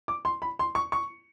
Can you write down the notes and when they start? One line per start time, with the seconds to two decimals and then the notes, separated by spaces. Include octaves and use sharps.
0.08 D6
0.25 C6
0.42 B5
0.59 C6
0.75 C#6
0.92 C#6